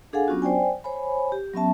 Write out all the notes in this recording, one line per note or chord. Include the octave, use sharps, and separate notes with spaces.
D4 G#4 A4 F5 F#5 G#5
F#3 B3 C#4 D4 F4 F#4
C5 D5 G5 G#5
C5 C#5 G#5 B5
G4
F#3 B3 C#4 E5 A5